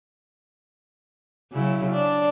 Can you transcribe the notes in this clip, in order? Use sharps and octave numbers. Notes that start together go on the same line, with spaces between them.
C#3 F#3 E4
D4